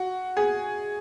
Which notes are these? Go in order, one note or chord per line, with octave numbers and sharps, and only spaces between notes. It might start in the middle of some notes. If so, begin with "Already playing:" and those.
Already playing: F#4
G#4